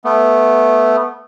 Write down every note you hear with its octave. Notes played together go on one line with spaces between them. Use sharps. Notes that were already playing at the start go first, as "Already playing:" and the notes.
A3 B3